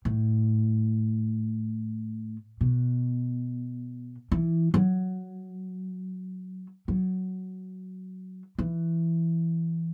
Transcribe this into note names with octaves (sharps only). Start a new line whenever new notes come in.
A2
B2
E3
F#3
F#3
E3